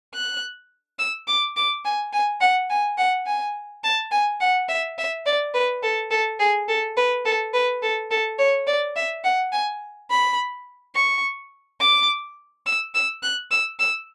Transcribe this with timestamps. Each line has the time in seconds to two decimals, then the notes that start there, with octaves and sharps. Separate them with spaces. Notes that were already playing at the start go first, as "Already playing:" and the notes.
0.14 F#6
0.99 E6
1.28 D6
1.57 D6
1.85 G#5
2.13 G#5
2.41 F#5
2.70 G#5
2.98 F#5
3.26 G#5
3.84 A5
4.12 G#5
4.41 F#5
4.69 E5
4.98 E5
5.26 D5
5.54 B4
5.83 A4
6.11 A4
6.39 G#4
6.68 A4
6.97 B4
7.25 A4
7.54 B4
7.82 A4
8.11 A4
8.39 C#5
8.67 D5
8.96 E5
9.24 F#5
9.52 G#5
10.10 B5
10.95 C#6
11.80 D6
12.66 E6
12.95 E6
13.23 F#6
13.51 E6
13.79 E6